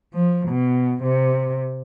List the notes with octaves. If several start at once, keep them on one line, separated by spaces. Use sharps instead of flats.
F3
B2
C3